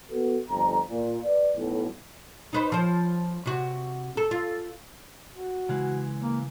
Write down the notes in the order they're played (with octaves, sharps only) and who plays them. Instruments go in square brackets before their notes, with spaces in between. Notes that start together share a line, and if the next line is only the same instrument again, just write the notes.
[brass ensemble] B3 F#4 A4 B4
G1 F2 A#5
A#2
B4 D5
B1 A2
[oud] D#4 B4 C5
F3 C5
C3 F#4
A4
F4
[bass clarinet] F#4
[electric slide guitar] C#3 E3 G#3
[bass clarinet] A#3